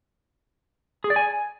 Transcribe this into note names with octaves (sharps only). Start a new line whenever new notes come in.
G#4
D5
G#5